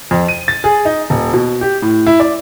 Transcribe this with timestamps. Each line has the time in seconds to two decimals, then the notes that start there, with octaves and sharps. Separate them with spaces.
0.11 F2
0.28 D#7
0.48 A6
0.64 G#4
0.85 D#4
1.10 D#1
1.33 B2
1.61 G4
1.82 A2
2.06 E4
2.20 D5